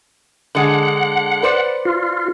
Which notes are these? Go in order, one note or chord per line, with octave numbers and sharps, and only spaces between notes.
D3 G#3 F#5
B4 C5 D5
F4